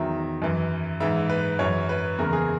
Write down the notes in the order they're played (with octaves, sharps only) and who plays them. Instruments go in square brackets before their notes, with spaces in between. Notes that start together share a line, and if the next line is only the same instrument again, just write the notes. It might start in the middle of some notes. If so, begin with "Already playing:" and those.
Already playing: [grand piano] E2 D#3 F#3 E5
F#2 E3
G#2 E3 E5
B4
F#2 E3 C#5
B4
E2 C#3 E3 A#4
G#4